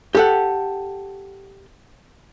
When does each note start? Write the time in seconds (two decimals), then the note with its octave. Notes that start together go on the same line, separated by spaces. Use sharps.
0.15 G4 A4 F#5